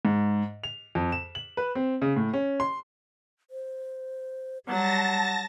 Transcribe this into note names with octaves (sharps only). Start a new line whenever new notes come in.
G#2
F7
F2
E7
F#7
B4
C4
C#3
A2
C#4
C6
C5
F#3 G3 F#5 A5 A6 A#6